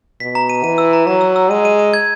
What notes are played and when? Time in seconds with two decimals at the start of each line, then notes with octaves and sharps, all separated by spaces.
0.20 B2 B6
0.35 A#5
0.49 D#7
0.64 E3 D#7
0.78 E6
0.93 A#5
1.07 F#3 A#5
1.21 E6
1.36 E6
1.51 G#3 D#7
1.65 D#7
1.79 D#7
1.94 G#6